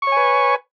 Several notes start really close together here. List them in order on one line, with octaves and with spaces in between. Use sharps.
C#6 C#5 G#5 B4